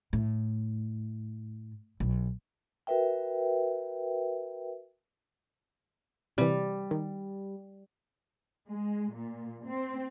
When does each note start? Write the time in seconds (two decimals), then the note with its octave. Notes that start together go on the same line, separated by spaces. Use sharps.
0.13 A2
2.00 B1
2.87 F#4 A#4 B4 E5 G5
6.38 C3 E3 G3
6.91 D#3
8.68 G#3
9.13 A#2
9.66 C4